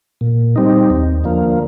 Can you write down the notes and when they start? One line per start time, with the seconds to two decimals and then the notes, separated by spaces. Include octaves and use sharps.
0.21 A#2
0.56 G3 C4 D#4
0.90 D#2
1.24 D3 F3 A#3